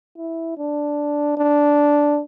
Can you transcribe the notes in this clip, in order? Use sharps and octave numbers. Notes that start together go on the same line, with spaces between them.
E4
D4
D4